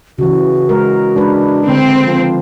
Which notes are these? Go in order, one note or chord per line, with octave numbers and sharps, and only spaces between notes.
C#3 E3 F#4
G#3 A#4
G#3 D4 B4
D3 C4
F3